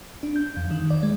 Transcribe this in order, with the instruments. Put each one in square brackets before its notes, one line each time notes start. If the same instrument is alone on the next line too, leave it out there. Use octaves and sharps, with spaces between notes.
[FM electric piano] D4
G6
F2
D#3
D5
G#3